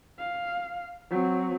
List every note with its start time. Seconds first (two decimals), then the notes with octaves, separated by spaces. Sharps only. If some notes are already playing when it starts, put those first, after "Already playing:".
0.19 F5
1.10 F#3 C4